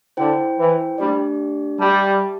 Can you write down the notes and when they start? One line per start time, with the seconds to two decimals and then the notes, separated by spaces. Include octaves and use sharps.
0.17 D3 E4 C5 G5
0.58 E3
0.98 G3 A3 D4 G4 D5
1.79 G3 G4 E5 A5